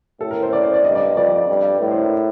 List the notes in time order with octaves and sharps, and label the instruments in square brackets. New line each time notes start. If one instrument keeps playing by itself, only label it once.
[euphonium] A2 [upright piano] A4
[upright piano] A#4
C5
D5
C5
D5
[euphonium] G2 [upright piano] D#5
[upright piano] D5
D#5
[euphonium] F2 [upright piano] D5
[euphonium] G2
A2
[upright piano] C5
A#4